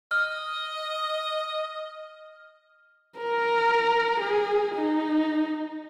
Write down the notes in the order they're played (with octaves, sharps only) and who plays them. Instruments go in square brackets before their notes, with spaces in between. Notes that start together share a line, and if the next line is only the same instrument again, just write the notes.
[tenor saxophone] D#5 [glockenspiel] F6
[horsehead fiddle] A#4
G#4
D#4